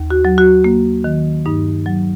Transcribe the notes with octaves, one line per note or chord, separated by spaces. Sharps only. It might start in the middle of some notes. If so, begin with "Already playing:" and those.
Already playing: D#2
F#4
F#3
F#4
A#3
D#3
G2 D#4
F#3